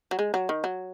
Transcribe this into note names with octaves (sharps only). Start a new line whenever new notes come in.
F#3
G#3
F#3
D#3
F#3